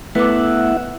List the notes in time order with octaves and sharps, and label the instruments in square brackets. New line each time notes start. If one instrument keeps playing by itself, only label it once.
[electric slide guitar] A3 B3 [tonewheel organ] E4 E5 F#5 [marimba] B4 D6